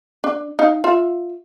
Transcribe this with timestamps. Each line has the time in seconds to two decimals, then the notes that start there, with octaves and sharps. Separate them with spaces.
0.24 D4
0.59 D#4 F5
0.84 F4 E5